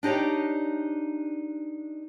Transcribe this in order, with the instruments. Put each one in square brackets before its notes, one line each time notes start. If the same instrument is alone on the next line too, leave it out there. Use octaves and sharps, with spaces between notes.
[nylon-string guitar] D4 D#4 G4 C#5 D5